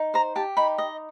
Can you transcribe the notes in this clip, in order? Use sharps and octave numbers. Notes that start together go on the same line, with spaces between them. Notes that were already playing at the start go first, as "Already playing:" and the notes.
Already playing: D#4
C5 A#5
G4 A5
D#4 B5
D#5